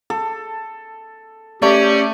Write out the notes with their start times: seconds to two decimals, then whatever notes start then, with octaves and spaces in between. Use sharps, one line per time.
0.10 A4
1.62 A3 C#4 G4 D5